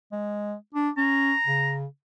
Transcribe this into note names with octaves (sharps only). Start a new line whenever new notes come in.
G#3
D4
C#4 A#5
C#3